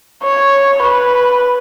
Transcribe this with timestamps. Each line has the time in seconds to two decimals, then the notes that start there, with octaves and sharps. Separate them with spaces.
0.23 C#5
0.82 B4